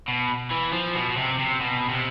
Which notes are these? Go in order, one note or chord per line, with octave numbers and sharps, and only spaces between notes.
B2
E3
F3
B2
B2
C3
C3
B2
C3